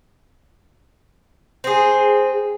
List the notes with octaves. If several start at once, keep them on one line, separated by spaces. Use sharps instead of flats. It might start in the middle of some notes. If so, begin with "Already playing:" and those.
C4 G#4